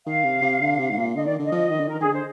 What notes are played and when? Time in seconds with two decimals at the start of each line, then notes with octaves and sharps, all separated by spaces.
0.06 D#3 F5
0.24 C3
0.42 C3
0.61 D3
0.79 C3
0.90 G#2
0.97 A#2
1.15 D3 D#5
1.25 D#3 D5
1.39 D3 D#5
1.52 F3
1.70 D#3
1.80 D3
1.88 D#3 A#4
2.00 D#3 G#4
2.06 D3
2.13 C5